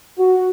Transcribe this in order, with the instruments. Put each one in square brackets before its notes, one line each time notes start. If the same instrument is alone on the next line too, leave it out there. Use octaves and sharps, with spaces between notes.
[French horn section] F#4